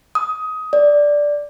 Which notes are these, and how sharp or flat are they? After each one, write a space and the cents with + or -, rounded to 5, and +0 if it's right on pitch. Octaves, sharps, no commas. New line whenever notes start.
D#6 +20
D5 -5